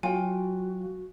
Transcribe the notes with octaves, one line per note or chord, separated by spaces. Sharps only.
F#3 F4 F#4 G5 G#5